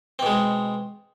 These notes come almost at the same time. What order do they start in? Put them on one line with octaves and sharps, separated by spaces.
C4 B2 G#3